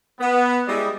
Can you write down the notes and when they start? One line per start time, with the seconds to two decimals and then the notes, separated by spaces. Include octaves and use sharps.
0.20 B3
0.67 G3 G#3 E4 D5 D#5